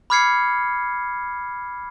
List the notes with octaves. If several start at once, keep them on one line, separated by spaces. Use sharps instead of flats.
B5 D6 F6 G#6 C7 C#7